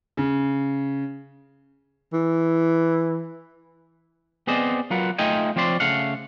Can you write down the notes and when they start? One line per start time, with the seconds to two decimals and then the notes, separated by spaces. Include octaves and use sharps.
0.17 C#3
2.13 E3
4.47 B3 C4 G#4 C5 D5 D#5
4.90 F#3 F4 A#4 B4 F#5
5.18 A3 D#4 F4 D#5 G5 G#5
5.56 F3 C4 C#5 D5 C6
5.80 C#3 A3 F5 F#5